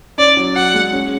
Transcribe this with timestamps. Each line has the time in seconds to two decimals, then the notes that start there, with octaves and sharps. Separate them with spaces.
0.18 C#4 D5
0.37 F#3
0.55 F#4 F#5
0.74 G#3
0.93 C#4